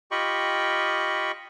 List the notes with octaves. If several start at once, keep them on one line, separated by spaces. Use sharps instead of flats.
F4 G4 D#5 G5 B5 C#6